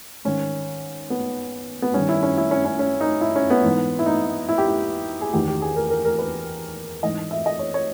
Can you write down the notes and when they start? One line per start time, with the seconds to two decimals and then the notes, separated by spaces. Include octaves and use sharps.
0.25 G#2 D#3 C#4
1.10 B3
1.82 B3
1.94 G2 D#3 C#4
2.09 E4
2.23 C#4
2.37 E4
2.51 C#4
2.65 C#4
2.79 C#4
3.01 D#4
3.21 E4
3.36 C#4
3.50 B3
3.64 G#2 E3
3.99 E4
4.06 D#4
4.49 E4
4.58 G4
4.67 E4
5.21 G#4
5.33 E2 D#3 G4
5.48 G4
5.62 G#4
5.76 A#4
5.90 A#4
6.05 A#4
6.18 B4
7.03 G#2 E3 D#5
7.31 E5
7.46 D#5
7.59 C#5
7.74 C#5